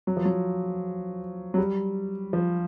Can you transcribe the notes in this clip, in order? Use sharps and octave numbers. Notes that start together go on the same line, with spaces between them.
F#3
F3
F#3
F#3
G3
F3